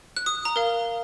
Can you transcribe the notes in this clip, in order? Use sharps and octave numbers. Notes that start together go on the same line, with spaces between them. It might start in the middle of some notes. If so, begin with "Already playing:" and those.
F#6
D#6
A#5
A#4 F5